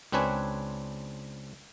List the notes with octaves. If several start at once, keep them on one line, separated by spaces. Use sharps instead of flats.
C#2 C4 D4 B4 C#5 G#5